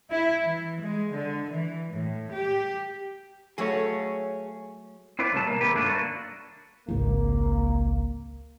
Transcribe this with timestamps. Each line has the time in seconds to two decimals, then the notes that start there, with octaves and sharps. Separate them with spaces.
0.11 E4
0.44 E3
0.83 G#3
1.15 D3
1.53 E3
1.92 A2
2.33 G4
3.58 F#3 A3 G#4 A4 C#5
5.19 C4 E4 F4 B4 D5
5.33 F2 A2 C3 F#3 G3 A5
5.47 B2 A#3
5.61 C3 D#3 G#3 G4 B4
5.76 G2 F#3 A3 D4 F4
5.88 A#3 D4 F#4
6.89 G#1 C#2 A#3